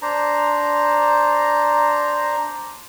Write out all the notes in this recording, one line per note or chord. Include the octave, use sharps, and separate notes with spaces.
D4 C5 A#5